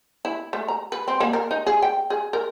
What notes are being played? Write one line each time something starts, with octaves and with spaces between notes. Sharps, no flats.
E4
A3
A#5
B4
C4
A#3
A#4
D#4
G#4
G5
G#4
A#4